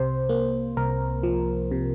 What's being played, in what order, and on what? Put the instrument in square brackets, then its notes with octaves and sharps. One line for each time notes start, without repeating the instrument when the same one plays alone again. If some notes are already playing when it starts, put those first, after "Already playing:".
Already playing: [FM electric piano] C2 C3 C5
A#3
C2 A#4
F3
C3